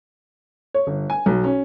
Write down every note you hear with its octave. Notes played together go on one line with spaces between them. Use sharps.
C#5
G1
G#5
B1
C#4